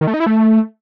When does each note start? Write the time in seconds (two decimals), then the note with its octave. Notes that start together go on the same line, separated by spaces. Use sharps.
0.01 D#3
0.07 A3
0.14 D#4
0.20 E4
0.26 A3